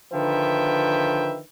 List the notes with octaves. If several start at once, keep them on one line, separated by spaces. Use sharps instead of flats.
D3 D#3 F3 B4 E5 G5